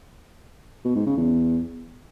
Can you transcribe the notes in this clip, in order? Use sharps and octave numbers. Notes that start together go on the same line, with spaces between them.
B2
G#2
C#3
E2